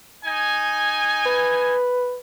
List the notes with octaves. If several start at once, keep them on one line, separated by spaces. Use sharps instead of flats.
D#4 G#5
B4